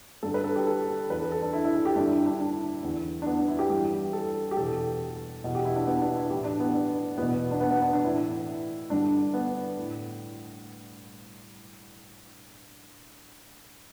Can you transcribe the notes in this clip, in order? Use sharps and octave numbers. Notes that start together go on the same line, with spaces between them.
G2 D3 A4
B4
A4
G4
A4
E2 E3 B4
A4
A4
D4
E4
E4
A4
G4
G2 D3 D4
E4
D4
D4
E2 D3
D4
B3
D4
E4
G4
G2 E3 G4
A4
G4
E2 B2 A4
E2 B2
G4
E4
D4
B3
D4
E4
A2 E3 G4
D4
B3
D4
E2 B2 B3
D4
B3
B3
D4
D4
A2 E3 E4
G2 D3 D4
B3
A2